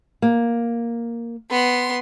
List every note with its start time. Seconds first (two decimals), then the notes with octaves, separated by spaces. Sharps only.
0.22 A#3
1.50 B3 C6